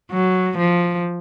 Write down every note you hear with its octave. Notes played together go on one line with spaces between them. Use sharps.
F#3
F3